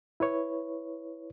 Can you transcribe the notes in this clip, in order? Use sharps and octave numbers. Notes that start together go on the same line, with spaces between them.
E4 B4 C#5